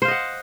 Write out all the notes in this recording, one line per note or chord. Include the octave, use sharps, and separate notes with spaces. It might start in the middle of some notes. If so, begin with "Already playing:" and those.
C5 D#5 F5 F#5